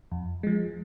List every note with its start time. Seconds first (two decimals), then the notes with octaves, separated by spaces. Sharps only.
0.12 F2
0.43 F3 G#3